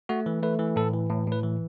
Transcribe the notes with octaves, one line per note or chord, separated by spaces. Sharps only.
A3 F#4
E3
A3 B4
E3
A2 A4
E3
A2
A2 B4
E3